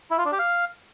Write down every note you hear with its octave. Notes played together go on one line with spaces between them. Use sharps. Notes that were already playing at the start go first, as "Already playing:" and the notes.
E4
F4
D4
G4
F5